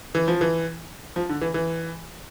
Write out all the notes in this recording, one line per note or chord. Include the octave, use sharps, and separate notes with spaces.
E3
F3
E3
F3
D3
E3
E3